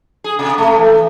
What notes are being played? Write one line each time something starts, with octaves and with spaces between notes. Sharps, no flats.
G#4
C3
A3
E3